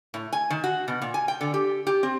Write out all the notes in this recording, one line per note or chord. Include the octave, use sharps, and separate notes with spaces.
A2
G#5
D#3
F#4
B2
A#2
G#5
G5
D3
G4
G4
C4